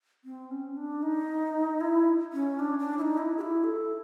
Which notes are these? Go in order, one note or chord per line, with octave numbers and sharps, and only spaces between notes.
C4
C#4
D4
D#4
E4
C#4
D4
D4
E4
D#4
E4
G#4
E4
A4